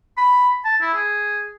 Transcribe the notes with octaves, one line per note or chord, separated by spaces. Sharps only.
B5
A5
E4
G#4